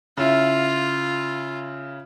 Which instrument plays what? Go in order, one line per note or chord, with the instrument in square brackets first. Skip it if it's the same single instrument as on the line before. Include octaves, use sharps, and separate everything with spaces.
[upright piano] C#3 E4 [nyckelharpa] F4